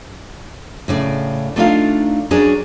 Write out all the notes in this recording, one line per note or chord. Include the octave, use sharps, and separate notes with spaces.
A2 C#3 D5
A3 D4 D#4 F4 A#4 F5
F#3 C#4 D4 G#4 A#4 D5